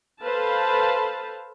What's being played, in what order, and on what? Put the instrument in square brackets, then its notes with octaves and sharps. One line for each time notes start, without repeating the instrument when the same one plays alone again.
[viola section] A4 B4 C5 F5 A5